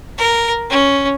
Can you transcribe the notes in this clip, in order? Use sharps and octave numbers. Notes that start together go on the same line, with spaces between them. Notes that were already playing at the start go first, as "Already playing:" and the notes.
A#4
C#4